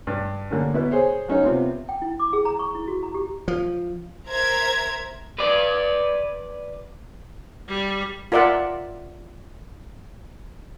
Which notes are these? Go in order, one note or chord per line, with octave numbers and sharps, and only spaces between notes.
G2
D3 A#3 C#4
B2 E4 B4
G#4 C5 C#5
F#3 C#4 D#4 C#5
C3 B3 C4 F4
G5
E4
D6
G#4
A#5
C#6
E4
F#4
A#5
G4
F3
A#4 C5 E5 A#5 G#6
B4 D5
G3
F4 A#4 D5 E5 F#5